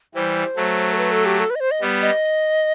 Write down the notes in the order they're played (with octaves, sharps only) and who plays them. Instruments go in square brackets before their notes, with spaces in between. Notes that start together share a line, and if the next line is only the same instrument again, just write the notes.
[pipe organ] E3 G3 [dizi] C5
[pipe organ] F#3 A3
[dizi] A4
B4
A4
G4
A4
B4
D#5
C5
D#5
[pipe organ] G3 B3
[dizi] D#5